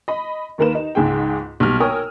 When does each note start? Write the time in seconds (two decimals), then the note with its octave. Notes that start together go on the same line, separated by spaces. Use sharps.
0.08 D#5 B5
0.58 D#2 D#3 A#3 A#4 B4 E7
0.75 D#4
0.95 C#2 G#2 G#4 G5
1.60 B1 G3 F6
1.80 A#4 C#5 G5 G#5 D#6 E6